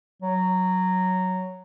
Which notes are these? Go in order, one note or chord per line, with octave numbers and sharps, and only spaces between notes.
F#3